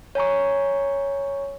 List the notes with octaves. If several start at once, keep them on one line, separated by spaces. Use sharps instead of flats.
C#5 G#5 A#5 C#6